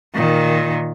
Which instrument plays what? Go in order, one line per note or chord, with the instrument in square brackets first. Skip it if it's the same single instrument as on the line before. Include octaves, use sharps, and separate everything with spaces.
[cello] A#2 D#3